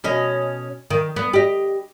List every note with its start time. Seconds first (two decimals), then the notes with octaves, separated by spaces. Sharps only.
0.04 B2 C#4 D#5
0.90 D#3
1.16 B3
1.33 G4 D#5